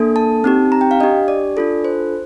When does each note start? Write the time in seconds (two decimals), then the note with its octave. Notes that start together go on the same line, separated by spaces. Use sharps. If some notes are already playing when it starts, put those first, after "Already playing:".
Already playing: A#3 D4 A4
0.16 A5
0.44 C4 D#4 G4
0.72 A#5
0.81 G5
0.91 F5
1.00 D4 G4 D#5
1.28 D5
1.57 D4 F4 A4
1.85 C5